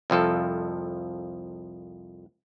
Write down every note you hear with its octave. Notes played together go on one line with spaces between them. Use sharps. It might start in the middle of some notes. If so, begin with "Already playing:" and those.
C2 F2 F3 A4